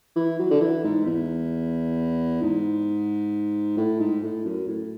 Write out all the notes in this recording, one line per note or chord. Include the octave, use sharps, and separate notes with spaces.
E3
F#3
D3
E3
G#2
E2
G#2
A2
G#2
A2
F#2
A2